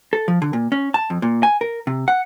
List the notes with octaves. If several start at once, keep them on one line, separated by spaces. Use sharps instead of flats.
A4
F3
D3
A#2
C#4
A5
F2
A#2
G#5
A#4
C3
F#5